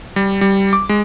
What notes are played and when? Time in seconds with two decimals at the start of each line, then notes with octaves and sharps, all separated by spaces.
0.16 G3
0.41 G3
0.73 D6
0.89 G#3